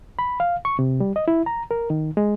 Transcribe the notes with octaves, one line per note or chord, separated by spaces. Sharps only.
B5
F5
C#6
C3
G3
D#5
E4
A#5
A#4
D#3
G#3